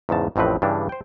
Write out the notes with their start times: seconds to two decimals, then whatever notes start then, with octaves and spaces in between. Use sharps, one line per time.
0.09 E2 G#2 C#3 A5
0.36 A1 F2 A2 C4 B4
0.62 G2 C#3 E3 G3 D4
0.89 C5 G5